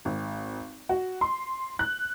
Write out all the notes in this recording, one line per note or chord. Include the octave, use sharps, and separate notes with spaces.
G#1
F#4
C6
F#6